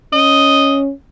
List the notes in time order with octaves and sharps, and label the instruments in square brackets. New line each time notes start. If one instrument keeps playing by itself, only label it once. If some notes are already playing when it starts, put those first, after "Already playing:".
[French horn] C#4 [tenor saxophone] D#5